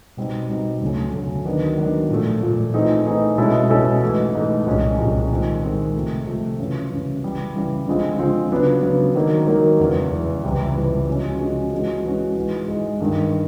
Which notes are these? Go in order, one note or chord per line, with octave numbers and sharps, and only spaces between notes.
B2 G3 C4 D#4
B2 G3 C4 D#4
D2 C#3 F#3 A3 C#4
D2 C#3 F#3 A3 C#4
D#3 F#3 B3 D4
D#3 F#3 B3 D4
A#2 F3 A3
A#2 F3 A3
E3 A3 C4 D#4 G#4
E3 A3 C4 D#4 G#4
B2 G#3 C#4 E4 A4
B2 G#3 C#4 E4 A4
G#2 E3 A3
G#2 E3 A3
C2 A#2 F3 G#3 C#4
C2 A#2 F3 G#3 C#4
D#3 G#3 C4
D#3 G#3 C4
C3 F3 A3
C3 F3 A3
F#2 C#3 E3
F#2 C#3 E3
C#3 E3 G3
C#3 E3 G3
D3 F3 G#3 C4 F4
D3 F3 G#3 C4 F4
C#3 F#3 B3 D4
C#3 F#3 B3 D4
D#3 F#3 A#3
D#3 F#3 A#3
E2 C#3 E3
E2 C#3 E3
C#2 C3 E3 G3
C#2 C3 E3 G3
C#3 F3 G#3 C#4 F#4
C#3 F3 G#3 C#4 F#4
E3 G#3 C#4 F#4
E3 G#3 C#4 F#4
G#2 E3 G#3
G#2 E3 G#3
G2 D#3 G3